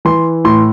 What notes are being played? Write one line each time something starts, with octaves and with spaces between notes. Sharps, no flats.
E3 C6
A2 C6